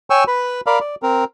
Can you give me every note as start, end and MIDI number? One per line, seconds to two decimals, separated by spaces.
0.10 0.24 73
0.10 0.24 79
0.10 0.24 80
0.10 0.24 85
0.10 0.24 88
0.28 0.61 71
0.28 0.61 83
0.67 0.79 70
0.67 0.79 74
0.67 0.79 77
0.67 0.79 83
0.80 0.95 74
1.03 1.24 60
1.03 1.24 70